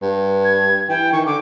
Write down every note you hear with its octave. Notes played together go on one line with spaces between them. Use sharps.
G2
G#6
E3 G5
D#3 C#6
D3 D6